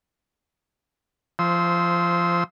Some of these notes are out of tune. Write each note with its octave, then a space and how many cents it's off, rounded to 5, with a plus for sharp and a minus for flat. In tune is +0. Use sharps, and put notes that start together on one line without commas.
F3 -20 C5 +0 E6 -30